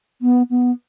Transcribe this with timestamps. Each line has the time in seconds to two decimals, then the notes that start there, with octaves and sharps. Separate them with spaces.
0.22 B3
0.50 B3